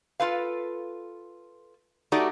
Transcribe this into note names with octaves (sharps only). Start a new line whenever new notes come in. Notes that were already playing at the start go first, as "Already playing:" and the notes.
F4 A4 B4 F5
A3 D#4 F#4 G4 D5